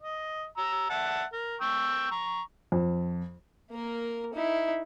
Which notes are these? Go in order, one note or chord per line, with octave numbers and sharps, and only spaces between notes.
D#5
A#5 E6
E5 F#5 A5
A#4
G5 C#6 E6
A#5 C#6
F2
A#3 A#4
D#4 E4